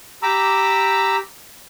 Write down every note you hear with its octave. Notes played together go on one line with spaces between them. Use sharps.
G4 A#5 B5 D6 E6